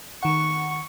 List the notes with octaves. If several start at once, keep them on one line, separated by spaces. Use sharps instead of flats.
D#3 F#5 C#6